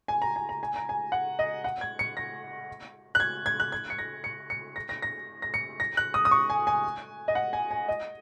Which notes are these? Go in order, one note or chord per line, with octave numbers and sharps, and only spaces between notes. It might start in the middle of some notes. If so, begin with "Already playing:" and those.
G#5
A#5
G#5
A#5
G#5
A#5
G#5
F#5
D#5
F#5
G#6
C#7
A#6
F#6
G#6
G#6
F#6
G#6
C#7
A#6
C#7
C#7
A#6
A#6
A#6
A#6
C#7
A#6
F#6
D#6
D#6
C#6
G#5
G#5
D#5
F#5
G#5
G#5
D#5